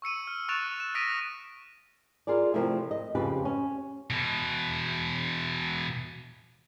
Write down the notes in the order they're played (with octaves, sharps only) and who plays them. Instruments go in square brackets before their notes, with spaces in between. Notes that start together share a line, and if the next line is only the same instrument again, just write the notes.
[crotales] C#6 E6 C#7 D#7
F6
C#6 F#6 A6 D7 E7 F7
E7
D#6 F#6 A#6 B6 D7 D#7
[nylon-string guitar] F4 G#4 A#4 D5
C3 F3 A3 E4 A#4 E5
D#5
F2 C#3 F4 G4 B4
C#4
[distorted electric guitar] B2 E3